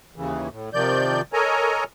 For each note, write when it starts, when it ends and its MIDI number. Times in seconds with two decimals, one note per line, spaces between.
0.16 0.49 39
0.16 0.49 49
0.16 0.49 52
0.51 0.70 45
0.73 1.21 48
0.73 1.21 51
0.73 1.21 53
0.73 1.21 74
0.73 1.21 91
1.33 1.84 69
1.33 1.84 70
1.33 1.84 73
1.33 1.84 75
1.33 1.84 80
1.33 1.84 82